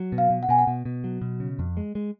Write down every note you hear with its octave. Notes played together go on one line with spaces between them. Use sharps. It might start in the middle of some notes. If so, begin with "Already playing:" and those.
Already playing: F#3
B2
F5
B2
F#5
B2 G#5
F#5
B2
B2
F#3
B2
C#3
F2
G#3
G#3